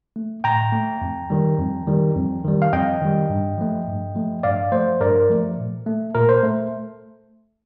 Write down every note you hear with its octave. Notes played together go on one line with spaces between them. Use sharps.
A3
A2 G5 A#5
A3
F2
D#3 G3
F2
D#3 G3
F2
D#3 G3
F5
F2 D#5 G5
D#3 G3
G2
F3 A3
G2
F3 A3
G2 D5 F5
F3 A3 C5
G2 A#4 D5
F3 A3
A#2
A3
A#2 A#4
C5
A3